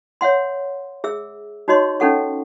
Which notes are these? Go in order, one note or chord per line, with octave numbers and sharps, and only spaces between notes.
C#5 E5 F#5 C6
G#4 E5 E6
D#4 F#4 C#5 D#5 C6 C#6
C#4 D#4 A4 F#5 C#6